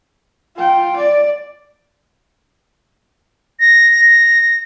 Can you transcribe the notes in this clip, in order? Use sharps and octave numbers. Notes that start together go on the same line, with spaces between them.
F4 G5
D5
A#6